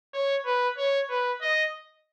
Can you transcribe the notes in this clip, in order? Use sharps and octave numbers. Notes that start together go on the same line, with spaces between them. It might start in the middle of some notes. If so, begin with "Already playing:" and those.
C#5
B4
C#5
B4
D#5